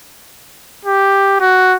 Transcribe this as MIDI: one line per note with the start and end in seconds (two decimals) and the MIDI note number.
0.85 1.37 67
1.41 1.77 66